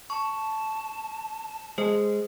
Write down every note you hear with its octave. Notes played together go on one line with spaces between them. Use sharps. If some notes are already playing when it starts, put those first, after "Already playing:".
A5 C#6
G#3 C5